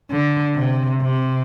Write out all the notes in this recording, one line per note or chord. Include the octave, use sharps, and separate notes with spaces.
D3
C3
C3